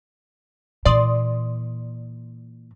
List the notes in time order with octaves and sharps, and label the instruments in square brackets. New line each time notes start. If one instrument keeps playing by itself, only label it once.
[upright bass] A#2 E3 [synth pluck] D5 C6 D#6